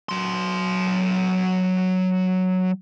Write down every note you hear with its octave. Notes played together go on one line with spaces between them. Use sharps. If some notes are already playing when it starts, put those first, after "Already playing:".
F#3 C6